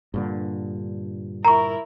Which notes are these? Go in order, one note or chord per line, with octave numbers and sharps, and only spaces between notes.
G2 A#2 D3
E4 A#4 A#5 C#6